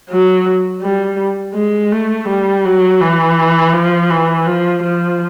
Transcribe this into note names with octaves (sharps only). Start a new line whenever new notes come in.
F#3
G3
G#3
A3
G3
F#3
E3
F3
E3
F3
F3